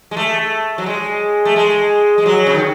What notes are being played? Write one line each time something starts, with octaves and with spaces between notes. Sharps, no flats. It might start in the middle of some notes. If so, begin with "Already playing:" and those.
G#3
A3
F#3
G#3
A3
G#3
G#3
F#3
C#3
D#3